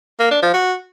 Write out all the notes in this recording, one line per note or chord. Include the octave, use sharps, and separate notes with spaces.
A#3
D4
F3
F#4